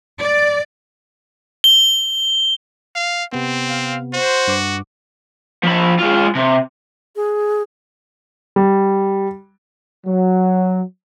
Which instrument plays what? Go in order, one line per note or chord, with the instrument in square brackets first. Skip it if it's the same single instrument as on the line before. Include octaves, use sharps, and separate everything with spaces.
[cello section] D5
[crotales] G7
[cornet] F5
[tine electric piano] C3 B3 [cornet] C4
[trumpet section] F5
[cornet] F#4 [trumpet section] C5
[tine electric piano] G2 D6
[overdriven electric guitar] F3 B5
G#3 F4
C3
[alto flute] G#4
[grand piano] G3
[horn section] F#3